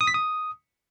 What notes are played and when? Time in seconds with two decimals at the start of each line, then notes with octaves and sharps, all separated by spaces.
0.01 D#6
0.07 B6
0.14 D#6